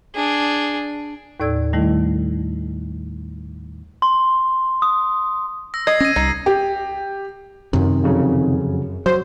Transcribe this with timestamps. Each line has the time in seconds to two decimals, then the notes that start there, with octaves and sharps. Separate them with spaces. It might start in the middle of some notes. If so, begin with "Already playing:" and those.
0.15 D4 G#4
1.40 D#2 A2 A4 D5 E6 G#6
1.73 D#3 G3 A3 E4
4.02 C6
4.82 D#6
5.74 E6 A#6
5.87 D#5 G#6 C7
6.00 C#4 A#6 D#7
6.16 C2 D#4
6.46 G4
7.73 F#2 C3 D#3
8.03 F2 C#3 F#3
9.06 F#3 C5